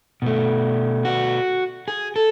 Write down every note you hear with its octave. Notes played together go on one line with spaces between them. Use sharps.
B2 A3
F#4
G#4
A4